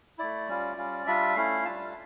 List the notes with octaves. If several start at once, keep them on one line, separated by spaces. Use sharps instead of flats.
A3 E4 D5
G3 C#4 F4
G3 C#4 F4
G3 D4 F4 E5
A3 C#4 E4 F5
G3 D4 F4 A5